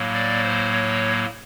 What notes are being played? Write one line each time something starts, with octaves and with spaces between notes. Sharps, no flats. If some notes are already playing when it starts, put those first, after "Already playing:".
Already playing: A2 F#3 A#3
D5
C5
C#5